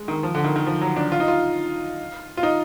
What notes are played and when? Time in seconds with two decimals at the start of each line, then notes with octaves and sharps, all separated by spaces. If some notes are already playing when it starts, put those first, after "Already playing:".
Already playing: G#3
0.08 D#3
0.23 F3
0.35 D3
0.44 D#3
0.56 D#3
0.66 F3
0.81 F#3
0.96 D4
1.12 F4
1.20 D#4
1.28 F4
2.37 F4
2.43 D#4